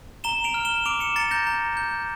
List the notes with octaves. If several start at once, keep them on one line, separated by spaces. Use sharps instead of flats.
A#5 E7 G7
D7 F7
F6
E7 G7
D6 D7 F7
C#7 E7
A#5 A6 C#7
G6 A#6
A#5
G6